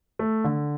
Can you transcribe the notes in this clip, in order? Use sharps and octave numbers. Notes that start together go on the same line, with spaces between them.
A3
D3